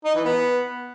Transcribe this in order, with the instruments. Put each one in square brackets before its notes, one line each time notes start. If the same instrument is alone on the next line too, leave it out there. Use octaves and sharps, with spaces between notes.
[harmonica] D#4
E3
B3